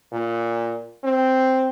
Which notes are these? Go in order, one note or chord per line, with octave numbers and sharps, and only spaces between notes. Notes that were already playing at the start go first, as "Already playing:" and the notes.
A#2
C4